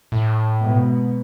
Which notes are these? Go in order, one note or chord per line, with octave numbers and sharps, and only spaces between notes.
A2
G#2 B2 B3